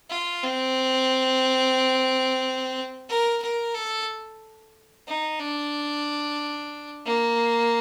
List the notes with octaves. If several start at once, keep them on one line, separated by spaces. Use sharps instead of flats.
F4
C4
A#4
A#4
A4
D#4
D4
A#3